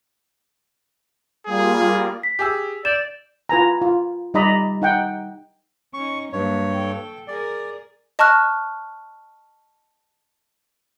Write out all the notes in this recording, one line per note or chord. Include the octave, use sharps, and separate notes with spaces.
G3 A#3 F4 G#4
B6
G4 G#4 E6
D5 G6 E7
F4 B4 G#5 A#5
F4
G3 D#4 D5 D#5 A#5 B5
D#4 F#5 G5
C#4 D#4 C#6
G2 F#3 A#3 C#5
A4 G5
G#4 A#4 D5
D#5 A5 C#6 F6 F#6